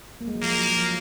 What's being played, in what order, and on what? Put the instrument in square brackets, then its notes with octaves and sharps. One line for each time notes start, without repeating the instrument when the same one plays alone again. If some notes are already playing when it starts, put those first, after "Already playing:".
[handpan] A#3
G#3
F#3
[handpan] F3 [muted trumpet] A#3
[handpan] F#3
F3